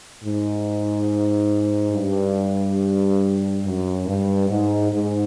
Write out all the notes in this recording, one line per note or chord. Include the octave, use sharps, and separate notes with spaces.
G#2
G2
F#2
G2
G#2
G#2